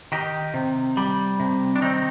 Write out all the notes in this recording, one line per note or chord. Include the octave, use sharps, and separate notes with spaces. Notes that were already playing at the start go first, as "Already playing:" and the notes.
D#3 D#4 G4
C3
G3
C3
D4
D#3 C4 D#4